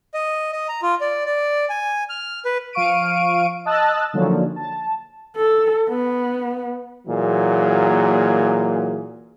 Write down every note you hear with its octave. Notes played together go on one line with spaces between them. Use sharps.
D#5
D#5
A#5
F4
D5
D5
G#5
F6
B4
F3 F5 C#6 D7 D#7
D#5 A5 E6 F#6 A6
D3 D#3 F3 F#3 A#3 C#4
A5
A4
B3
A#2 E3 F#3 A#3 G#4